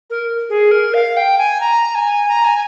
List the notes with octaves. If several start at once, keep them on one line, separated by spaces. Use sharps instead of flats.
A#4
G#4
A#4
F5
G5
G#5
A#5
G#5
A#5
G#5